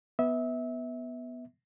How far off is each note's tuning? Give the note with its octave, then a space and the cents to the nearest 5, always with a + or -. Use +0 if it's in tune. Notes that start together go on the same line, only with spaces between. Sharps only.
B3 +0 E5 -25